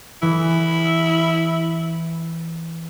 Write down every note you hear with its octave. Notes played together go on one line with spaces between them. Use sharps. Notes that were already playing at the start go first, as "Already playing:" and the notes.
E3 E4